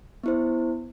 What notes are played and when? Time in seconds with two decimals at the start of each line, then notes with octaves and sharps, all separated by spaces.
0.24 B3 E4 C5